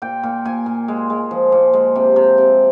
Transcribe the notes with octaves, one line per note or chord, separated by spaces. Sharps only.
A#2 G5
A#2
A#2 G#5
A#2
G#3
G#3
F3
A#2
G#3
C3
C3
C3